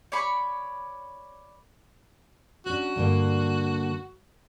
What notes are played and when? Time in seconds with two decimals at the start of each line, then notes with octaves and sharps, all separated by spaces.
0.12 C#5 D5 B5 C#6
2.66 C#4 D4 F#4
2.96 G2 D3 A#3